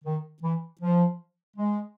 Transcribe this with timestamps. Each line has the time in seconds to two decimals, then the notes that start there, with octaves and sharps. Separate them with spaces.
0.05 D#3
0.42 E3
0.81 F3
1.57 G#3